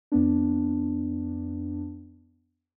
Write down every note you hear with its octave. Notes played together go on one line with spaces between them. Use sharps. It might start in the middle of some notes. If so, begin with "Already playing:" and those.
F2 B3 D4